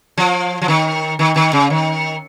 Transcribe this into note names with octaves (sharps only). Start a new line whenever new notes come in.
F3
F3
D#3
D#3
D#3
C#3
D#3